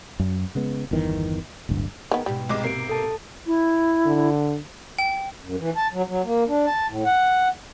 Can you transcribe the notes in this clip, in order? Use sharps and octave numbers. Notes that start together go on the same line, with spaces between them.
F#2
C#3 G#3 B3
G1 E2 D#3 E3
D1 G1 G2
D#3 B3 G#4 A#4
G#2 B2 G3
C2 G#3 D6
C3 A#3 C7 D7
A4 A5
E4
D3
G5
F#2
E3
A5
F#3
F#3
A#3
D4
A5
A2
F#5